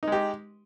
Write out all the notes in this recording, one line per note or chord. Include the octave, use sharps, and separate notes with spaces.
G#3 D#4 G4